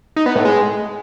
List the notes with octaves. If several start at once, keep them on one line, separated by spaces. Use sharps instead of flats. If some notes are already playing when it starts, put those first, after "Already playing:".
D#4
B3
A2
G#3